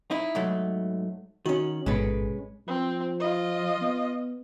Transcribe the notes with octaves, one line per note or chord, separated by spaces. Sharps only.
D#4 E4
G#2 F#3 A3
D#3 C#4 F#4
A1 G#2 B2 G#3 C#4 B4
F3 C4
F4 D#5
B3